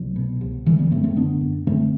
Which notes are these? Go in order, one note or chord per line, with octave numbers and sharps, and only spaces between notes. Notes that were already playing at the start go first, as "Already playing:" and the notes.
Already playing: C2 F#3 A3
B2
C2
D3 E3 G3
G3 B3
F#2 A3 C4
A3 C4
D3 B3 D4
F#2
D3 A3 C4